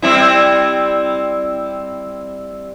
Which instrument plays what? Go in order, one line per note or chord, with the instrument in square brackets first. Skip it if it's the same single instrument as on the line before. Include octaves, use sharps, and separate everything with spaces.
[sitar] G3 C4 E4